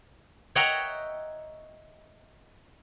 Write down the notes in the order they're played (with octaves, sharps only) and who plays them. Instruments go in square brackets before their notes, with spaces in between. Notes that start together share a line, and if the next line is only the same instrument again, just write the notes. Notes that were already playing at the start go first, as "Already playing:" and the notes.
[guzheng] C#5 D#5 E5 F#5 G5 A#5